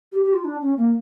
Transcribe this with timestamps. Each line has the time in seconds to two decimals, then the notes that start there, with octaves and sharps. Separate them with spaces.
0.12 G4
0.23 G4
0.33 F4
0.44 D4
0.61 C#4
0.77 A#3